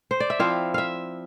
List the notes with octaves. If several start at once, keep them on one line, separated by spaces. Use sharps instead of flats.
C5
D5
E5
F3 C4 E4 F5
E5 F5